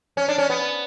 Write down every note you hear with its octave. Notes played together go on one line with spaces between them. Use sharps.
C#4
D4
C#4
B3